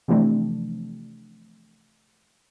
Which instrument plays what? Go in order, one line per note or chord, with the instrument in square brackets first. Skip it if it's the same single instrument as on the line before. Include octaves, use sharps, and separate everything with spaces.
[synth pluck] C3 E3 F3 A3 C4 D4